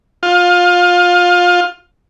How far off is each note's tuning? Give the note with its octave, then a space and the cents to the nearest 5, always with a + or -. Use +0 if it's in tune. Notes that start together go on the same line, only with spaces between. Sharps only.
F4 +25